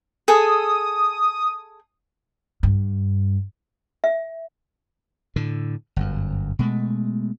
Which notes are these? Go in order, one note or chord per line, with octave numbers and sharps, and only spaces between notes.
G#4 A4 D#6
G2
E5
A2 D3
G1 F#2
B2 G#3 A3